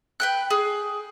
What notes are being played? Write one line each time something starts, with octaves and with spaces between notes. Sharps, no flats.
B4 G5 F#6
G#4